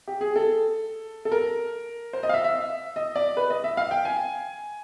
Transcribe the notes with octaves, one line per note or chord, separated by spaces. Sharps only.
G4
G#4
A4
A4
A#4
C5
D#5
F5
E5
E5
D#5
D5
B4
D#5
E5
F5
G5
G#5